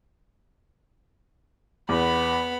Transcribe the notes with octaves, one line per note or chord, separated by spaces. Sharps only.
E2 B3 B5